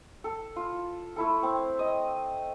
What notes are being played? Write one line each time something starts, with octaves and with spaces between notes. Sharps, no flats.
A4
F4
A3 E4 A4
C4
D#5